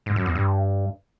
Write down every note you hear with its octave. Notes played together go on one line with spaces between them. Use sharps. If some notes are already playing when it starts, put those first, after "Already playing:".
G#2
F#2
E2
G2